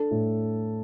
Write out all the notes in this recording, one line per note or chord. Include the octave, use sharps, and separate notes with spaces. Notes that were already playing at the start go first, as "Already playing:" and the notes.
Already playing: D4 A4
A2